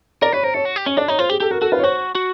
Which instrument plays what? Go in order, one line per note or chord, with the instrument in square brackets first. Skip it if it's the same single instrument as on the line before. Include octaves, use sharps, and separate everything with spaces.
[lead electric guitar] A#4 [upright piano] D5
[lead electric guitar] B4 [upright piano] C#5
[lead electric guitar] A#4 [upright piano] C5
[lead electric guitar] A4 [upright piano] C#5
[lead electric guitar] F#4
G4
[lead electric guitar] C#4 [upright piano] C#5
[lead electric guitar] D4 [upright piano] D5
[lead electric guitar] D#4 [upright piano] C#5
[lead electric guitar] F4 [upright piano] C5
[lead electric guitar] G4 [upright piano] G#4
[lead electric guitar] G4 [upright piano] A4
[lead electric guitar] F#4 [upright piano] A#4
[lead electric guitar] F#4 [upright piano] A4
[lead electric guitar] F4 [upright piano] B4
[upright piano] C#5
[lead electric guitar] F#4 [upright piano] C5
[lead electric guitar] F#4